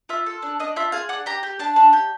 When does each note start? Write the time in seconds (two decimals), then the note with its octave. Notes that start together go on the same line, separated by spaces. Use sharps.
0.09 F4 E5
0.26 A4
0.42 D4
0.60 D4 D#5
0.76 F4 E5
0.92 G#4 F5
1.09 D4 F#5
1.26 G4 A#5
1.43 G4
1.59 D4 A5
1.76 D4
1.93 G4